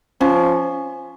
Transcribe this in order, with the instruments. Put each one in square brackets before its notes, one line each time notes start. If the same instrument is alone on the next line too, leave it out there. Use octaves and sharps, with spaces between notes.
[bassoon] F3 [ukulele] C#4